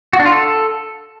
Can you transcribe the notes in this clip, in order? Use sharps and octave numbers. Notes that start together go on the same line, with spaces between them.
F#4
D4
F4
A4